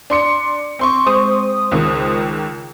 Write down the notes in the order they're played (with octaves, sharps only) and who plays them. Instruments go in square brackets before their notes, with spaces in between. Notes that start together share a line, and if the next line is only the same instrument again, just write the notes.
[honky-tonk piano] D4 C6 C#7
C4 C6 C#6
[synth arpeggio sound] G#3 C5 D#6
[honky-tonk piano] C#2 D#3